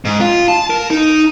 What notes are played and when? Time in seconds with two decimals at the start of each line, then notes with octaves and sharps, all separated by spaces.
0.05 G#2
0.21 F4
0.48 A5
0.70 A#4
0.90 D#4